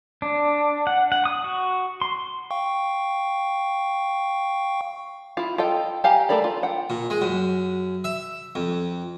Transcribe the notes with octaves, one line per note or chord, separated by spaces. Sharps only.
D4
F#5
F#5
D#6
F#4
C6
F5 G5 C#6
E4 F4
F4 A4 D#5 G5
G4 F5 G#5 A#5
A3 A4 A#4 D5 B5
F4
F#5 G5
A#2
G#3
F#2
E5
F2